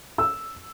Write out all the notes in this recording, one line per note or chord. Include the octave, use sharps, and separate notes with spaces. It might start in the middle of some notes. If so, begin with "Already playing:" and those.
E6